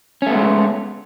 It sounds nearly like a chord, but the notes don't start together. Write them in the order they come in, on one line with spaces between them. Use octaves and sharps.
C#4 A3 B3 G#3